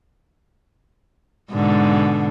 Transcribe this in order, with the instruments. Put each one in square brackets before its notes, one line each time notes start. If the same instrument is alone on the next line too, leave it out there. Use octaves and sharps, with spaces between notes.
[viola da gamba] G#2 B2 D3